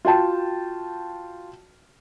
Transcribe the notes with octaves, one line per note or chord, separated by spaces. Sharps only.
F4 F#4 G5 A5